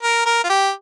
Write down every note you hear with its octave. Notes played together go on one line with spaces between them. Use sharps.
A#4
A#4
F4
G4